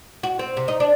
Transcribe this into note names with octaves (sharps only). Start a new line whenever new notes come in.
F#4
C4
C3
D#4
D4